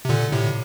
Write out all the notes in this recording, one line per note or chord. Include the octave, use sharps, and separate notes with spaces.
C3
A#2 D3
A2 C3